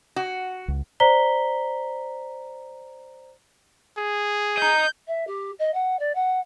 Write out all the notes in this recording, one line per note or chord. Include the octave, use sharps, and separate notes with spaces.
F#4
C#2
C5 D5 A#5 B6 G7
G#4
D#5 A#5 G6
E5
G4
D#5
F#5
D5
F#5